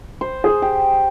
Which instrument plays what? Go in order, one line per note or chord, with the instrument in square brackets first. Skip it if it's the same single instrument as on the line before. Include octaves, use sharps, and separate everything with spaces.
[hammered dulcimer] C5
[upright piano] G#4
[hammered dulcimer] G4